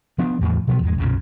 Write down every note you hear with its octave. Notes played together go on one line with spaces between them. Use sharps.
F3 B3 D4
E2 A2 F3
B2 F3 F#3 B3
E2 G#2 G#3
B1 F#2 A#2 C#3